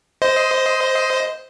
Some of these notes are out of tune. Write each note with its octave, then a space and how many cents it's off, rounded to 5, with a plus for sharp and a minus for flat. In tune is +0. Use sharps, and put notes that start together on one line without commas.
C5 +0 D#5 +15 C6 -20